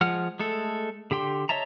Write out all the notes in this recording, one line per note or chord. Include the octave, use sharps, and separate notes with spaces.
F3 G#3 F#5 F6
G#3 A3 A4
D3 G4 G5 C6
C#5 D#5 E5 A5 A#5